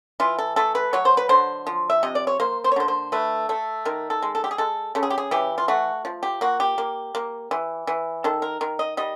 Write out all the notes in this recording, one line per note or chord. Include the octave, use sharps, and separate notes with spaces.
E3 F4
A4
A3 A4
B4
F#3 C#5
C5
B4
D3 C5
F3
E5
C3 D#5
D5
C#5
A#3 C5
C5
C#5
D3 C5
C5
A3 B4
A3 A4
D#3 A#4
A4
G#3
A4
G4
G#4
G#3 A4
C#3 A4
G#4
G4
G#4
E3 G4
F4
A3 F#4
F3
G4
A#3 F#4
G4
A#3
A#3
E3
E3
D#3 A4
A#4
D#3 A#4
D#5
G3 D#5